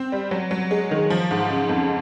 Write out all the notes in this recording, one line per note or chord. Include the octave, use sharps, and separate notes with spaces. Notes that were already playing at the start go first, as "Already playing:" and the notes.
Already playing: C4
G3
F#3
F#3
G#3
D#3
F3
G#2
C#3
F2